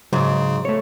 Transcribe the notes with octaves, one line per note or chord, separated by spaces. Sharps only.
G#2 C#3 F#3
A3 C#5